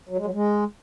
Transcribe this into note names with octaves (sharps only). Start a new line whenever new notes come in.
F#3
G#3
F#3
G#3